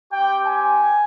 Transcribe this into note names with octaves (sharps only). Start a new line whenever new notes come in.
C4 G4 G5
G#5